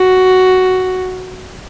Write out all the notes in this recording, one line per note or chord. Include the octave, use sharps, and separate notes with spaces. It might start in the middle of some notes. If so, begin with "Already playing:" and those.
Already playing: F#4